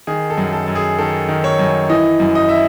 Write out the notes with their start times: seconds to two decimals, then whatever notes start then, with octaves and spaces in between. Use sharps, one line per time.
0.07 D#3 G#4
0.30 A4
0.38 F#2
0.53 A4
0.68 F#2
0.75 G#4
0.98 D#3 A4
1.29 D#3
1.44 C#5
1.59 F#2
1.90 E3 D#5
2.20 F#2
2.35 D#5
2.49 E5